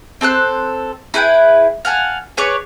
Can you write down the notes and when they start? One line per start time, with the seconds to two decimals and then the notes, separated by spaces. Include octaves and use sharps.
0.21 C4 A4 C5 F#6
1.14 E4 G#4 B4 G5
1.85 F5 F#5 G#5 A5
2.37 G#4 B4 C#5 D5